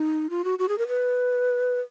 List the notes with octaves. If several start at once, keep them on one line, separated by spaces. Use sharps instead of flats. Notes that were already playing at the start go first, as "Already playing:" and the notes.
Already playing: D#4
F4
F#4
F#4
G#4
A#4
B4